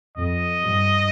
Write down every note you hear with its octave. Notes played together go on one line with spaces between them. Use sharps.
F2 D#5
G2